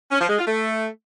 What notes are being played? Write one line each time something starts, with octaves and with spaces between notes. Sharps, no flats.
C#4
F3
G#3
F4
A3